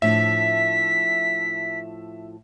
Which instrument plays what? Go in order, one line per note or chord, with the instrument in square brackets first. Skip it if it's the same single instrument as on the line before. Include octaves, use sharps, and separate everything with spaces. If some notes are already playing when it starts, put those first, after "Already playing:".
[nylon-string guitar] A2 F3 D4 [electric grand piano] E5 [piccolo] B6